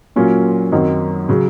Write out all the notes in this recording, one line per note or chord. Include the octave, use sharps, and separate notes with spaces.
A#2 F#3 A#3 C#4 F4
F#2 D#3 F#3 C4 D#4
C#3 F#3